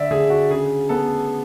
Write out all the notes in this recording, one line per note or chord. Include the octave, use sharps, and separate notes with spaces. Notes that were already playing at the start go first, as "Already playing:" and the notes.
Already playing: D3 D5 E5
D3 G#4
F#4
C#3 G#4
B3 A4